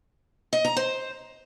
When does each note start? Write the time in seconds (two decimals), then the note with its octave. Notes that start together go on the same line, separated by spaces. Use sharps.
0.53 D#5
0.65 A#5
0.77 C5